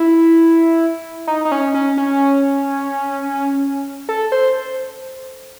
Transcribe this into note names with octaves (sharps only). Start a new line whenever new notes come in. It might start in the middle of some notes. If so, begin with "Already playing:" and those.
Already playing: E4
D#4
D#4
C#4
C#4
C#4
A4
C5